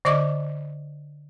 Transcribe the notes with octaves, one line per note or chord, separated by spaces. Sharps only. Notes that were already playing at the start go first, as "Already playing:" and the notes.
D3 D5 D#5 C#6 D6